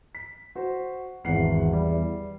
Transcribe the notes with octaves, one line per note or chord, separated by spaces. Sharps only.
B6
F#4 C5
G#1 E2 F#5 C7
G3